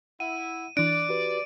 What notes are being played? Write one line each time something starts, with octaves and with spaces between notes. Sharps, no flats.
E4 F#5 D#7
E3 D4 D5 F#6 D7
F#4 G4 B4